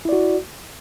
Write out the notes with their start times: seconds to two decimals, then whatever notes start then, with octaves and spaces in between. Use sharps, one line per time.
0.05 E4
0.09 D5
0.13 F#4